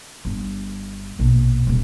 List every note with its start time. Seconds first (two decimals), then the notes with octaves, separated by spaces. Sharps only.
0.25 G1
1.19 A#1 B2
1.67 D#1 C2